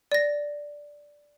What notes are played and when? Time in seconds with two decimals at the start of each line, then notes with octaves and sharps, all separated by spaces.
0.12 D5 A#6